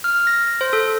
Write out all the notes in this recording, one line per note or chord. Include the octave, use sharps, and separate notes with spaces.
F6
A#6
C5
A4